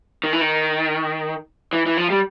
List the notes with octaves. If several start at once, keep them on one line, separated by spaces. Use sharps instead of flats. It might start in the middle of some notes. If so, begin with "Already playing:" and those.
D#3
E3
D#3
E3
E3
F3
G3